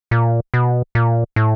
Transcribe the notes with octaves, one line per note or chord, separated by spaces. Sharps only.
A#2
B2
A#2
A2